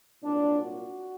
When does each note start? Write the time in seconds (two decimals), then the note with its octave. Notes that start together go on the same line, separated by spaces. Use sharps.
0.22 C2 A#2 F#3 D4
0.62 F#4